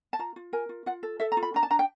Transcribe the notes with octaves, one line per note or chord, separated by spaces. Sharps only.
A5
F4 A#5
F4
A#4 G#5
F4
F4 F#5
A4
A4 E5
A#5
F4
B5
D4 A#5
A5
D4 A#5
G5